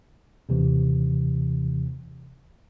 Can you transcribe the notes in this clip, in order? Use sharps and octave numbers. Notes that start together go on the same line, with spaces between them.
D#2 C3 E3